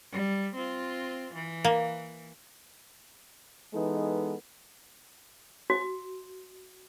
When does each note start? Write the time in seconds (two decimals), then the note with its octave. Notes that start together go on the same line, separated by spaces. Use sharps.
0.12 G3
0.55 C4 F4
1.34 E3
1.64 A#3
3.73 E3 G#3 B3 D#4 A4
5.70 F#4